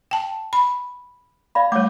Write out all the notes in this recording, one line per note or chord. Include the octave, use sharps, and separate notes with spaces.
G5 A5
B5
D5 F5 B5
G3 A3 C#5 D6